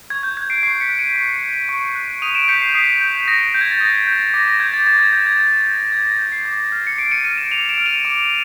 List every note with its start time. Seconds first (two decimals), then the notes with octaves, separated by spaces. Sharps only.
0.10 C#6 G#6
0.23 G6
0.37 F#6 G#6
0.50 C7 D7
0.63 C#6 C7
0.80 B6 C#7
0.89 F#6
0.99 C#7 D#7
1.16 C#6
1.43 F#6
1.69 C#6
1.95 F#6
2.22 D#6 D#7 F7
2.35 D7 E7
2.48 G6 B6 C#7
2.62 C7
2.74 D#6 C7
3.01 G6
3.27 D#6 A#6
3.54 G6
3.61 G#6
3.71 A6
3.80 D#6 A#6
4.07 G6
4.34 D6 A#6
4.48 A#6
4.60 G6 G#6
4.74 A6
4.87 D6 A6
4.99 G#6
5.13 G6 G#6
5.26 G#6
5.39 D6 G#6
5.67 G6
5.92 D6 G#6
6.06 A#6
6.18 G6
6.32 C7
6.45 D6
6.72 F6
6.87 C#7
6.98 D6 C7 D7
7.11 C#7 D#7
7.24 F6 C#7 D#7
7.38 D7 E7
7.52 D6 D#7 F7
7.69 D7 E7
7.78 F6
7.86 D#7 F7
8.05 D6